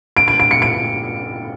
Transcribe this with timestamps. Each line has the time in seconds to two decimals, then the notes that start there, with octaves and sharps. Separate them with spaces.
0.17 D7
0.28 D7
0.40 D7
0.51 C#7
0.62 D7